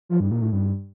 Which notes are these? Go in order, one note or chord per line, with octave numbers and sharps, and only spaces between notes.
F3
G2
A#2
A2
G2